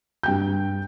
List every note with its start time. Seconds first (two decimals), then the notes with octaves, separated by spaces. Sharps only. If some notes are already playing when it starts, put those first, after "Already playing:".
0.23 G2 G5 G6